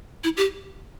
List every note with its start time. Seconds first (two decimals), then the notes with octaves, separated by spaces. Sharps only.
0.24 E4
0.37 G4